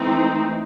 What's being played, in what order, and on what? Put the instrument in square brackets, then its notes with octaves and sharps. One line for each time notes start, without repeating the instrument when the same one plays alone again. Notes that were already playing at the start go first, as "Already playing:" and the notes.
Already playing: [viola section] E3 A3 C4 D#4